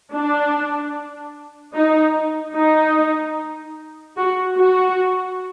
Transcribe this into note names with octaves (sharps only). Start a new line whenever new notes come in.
D4
D#4
D#4
F#4
F#4